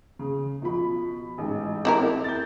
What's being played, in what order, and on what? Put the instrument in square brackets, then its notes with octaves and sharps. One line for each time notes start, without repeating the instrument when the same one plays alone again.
[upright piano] C#3
B2 F3 B5
A1 G#2
[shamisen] C4 E4 A#4
[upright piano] G6 A6